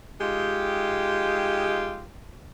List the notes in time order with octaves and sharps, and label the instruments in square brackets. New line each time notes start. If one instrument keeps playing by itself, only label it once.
[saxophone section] G#3 D#4 F4 G4